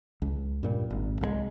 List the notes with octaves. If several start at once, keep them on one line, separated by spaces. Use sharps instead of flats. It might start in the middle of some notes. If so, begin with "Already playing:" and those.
C#2
G2 A#2 G3
G#1
C2 F3 G#3